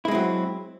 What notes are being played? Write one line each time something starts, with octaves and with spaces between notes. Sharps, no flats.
F#3 G#3 C4 E4